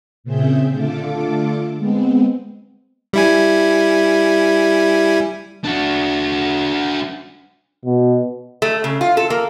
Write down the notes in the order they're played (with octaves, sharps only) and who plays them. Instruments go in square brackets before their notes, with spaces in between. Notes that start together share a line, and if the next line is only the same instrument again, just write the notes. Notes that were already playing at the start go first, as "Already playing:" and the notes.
[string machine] A#2 C#3 C4 G#4 E5 G6
D3 A3 F4 A4 D6
G#3 B3 C4
[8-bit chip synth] G3 E4 G#5
[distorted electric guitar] D4 F#4
[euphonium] B2
[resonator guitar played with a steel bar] A3
C#3
F4
A4
A#3